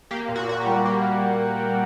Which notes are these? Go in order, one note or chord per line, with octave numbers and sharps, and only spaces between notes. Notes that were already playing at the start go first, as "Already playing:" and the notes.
A#3 G4
A#2
F#4
A#2 F#4
G4
G3
A#3